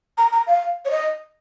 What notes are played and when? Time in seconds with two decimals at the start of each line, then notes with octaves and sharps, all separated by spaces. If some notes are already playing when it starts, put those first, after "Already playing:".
0.18 A#5
0.33 A#5
0.47 F5
0.85 C#5
0.91 D#5